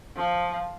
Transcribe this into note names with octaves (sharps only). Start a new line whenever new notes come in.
F3